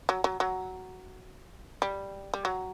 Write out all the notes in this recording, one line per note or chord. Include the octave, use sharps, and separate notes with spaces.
F#3
F#3
F#3
G3
G3
F#3